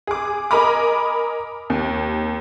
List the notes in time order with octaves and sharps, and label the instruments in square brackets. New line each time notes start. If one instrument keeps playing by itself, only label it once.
[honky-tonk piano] G#4 D6
A#4 D#5 G#5 A#5 B5 D6
D#2